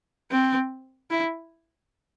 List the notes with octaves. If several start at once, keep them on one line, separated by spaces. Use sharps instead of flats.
C4
E4